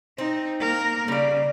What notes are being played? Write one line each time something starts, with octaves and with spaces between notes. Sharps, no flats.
C4 D#4
A#3 A#4
C#3 G3 D5